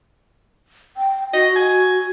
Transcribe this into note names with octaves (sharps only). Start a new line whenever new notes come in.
G5
F#4 D#5
G#5